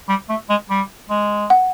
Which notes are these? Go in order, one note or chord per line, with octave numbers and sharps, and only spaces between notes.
G3
A3
G#3
G3
G#3
F#5